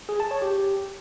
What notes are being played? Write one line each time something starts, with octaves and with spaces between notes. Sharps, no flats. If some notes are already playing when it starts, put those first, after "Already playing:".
G#4
A5
C#5
G4